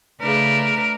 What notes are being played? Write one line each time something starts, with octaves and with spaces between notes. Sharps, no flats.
C#3 A3 D4 A#4 B4